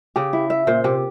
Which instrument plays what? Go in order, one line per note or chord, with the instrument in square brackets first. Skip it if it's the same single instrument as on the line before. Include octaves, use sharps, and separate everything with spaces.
[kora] C#3 [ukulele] G4
[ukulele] E4
E5
[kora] A#2 [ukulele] C5
[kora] C3 [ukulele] G4